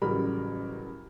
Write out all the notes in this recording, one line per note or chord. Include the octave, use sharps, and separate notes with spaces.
A1 C#3 F#3 G3 A#4 B5